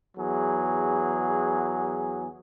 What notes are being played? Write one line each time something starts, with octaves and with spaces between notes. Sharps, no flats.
E2 F#3 G#4